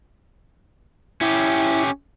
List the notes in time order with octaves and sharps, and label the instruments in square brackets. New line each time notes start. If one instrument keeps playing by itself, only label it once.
[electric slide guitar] C#4 G4 [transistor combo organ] E4